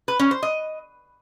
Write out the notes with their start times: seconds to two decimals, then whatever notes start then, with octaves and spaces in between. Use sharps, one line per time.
0.08 B4
0.19 C#4
0.31 C5
0.43 D#5